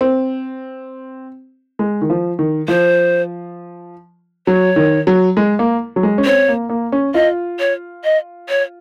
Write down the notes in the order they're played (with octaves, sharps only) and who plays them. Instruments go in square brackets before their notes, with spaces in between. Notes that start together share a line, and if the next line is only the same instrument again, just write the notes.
[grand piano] C4
G#3
D#3
F3
D#3
[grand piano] F3 [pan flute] C5
[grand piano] F#3 [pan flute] C#5
[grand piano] D#3
F#3
G#3
A#3
F#3
G#3
C#4
[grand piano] C4 [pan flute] C#5
[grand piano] A#3
A#3
C#4
[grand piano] F4 [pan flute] D#5
[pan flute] C#5
D#5
C#5